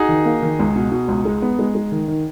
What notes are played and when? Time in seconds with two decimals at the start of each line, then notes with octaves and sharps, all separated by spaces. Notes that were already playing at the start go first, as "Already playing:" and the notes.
Already playing: D#4 F#4 G#4
0.09 D#3
0.26 A#3
0.42 D#3
0.59 C#2
0.76 B2
0.91 B2
1.08 C#2
1.25 G#3
1.42 B3
1.59 G#3
1.75 G#3
1.92 D#3
2.08 D#3